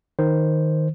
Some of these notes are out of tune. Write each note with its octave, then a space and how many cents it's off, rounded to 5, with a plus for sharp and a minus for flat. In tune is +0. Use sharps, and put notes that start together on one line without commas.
D#3 +0 C5 +0